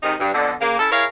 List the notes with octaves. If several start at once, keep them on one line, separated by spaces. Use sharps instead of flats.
G#2 C3 D#3 D#4
G2
F2 B2 D3
C#3 A#3
C#4 E4 A4
E4 G#4 A#4 C#5 F5